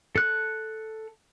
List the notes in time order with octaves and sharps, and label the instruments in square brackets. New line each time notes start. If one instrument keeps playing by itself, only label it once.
[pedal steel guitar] A4 F#6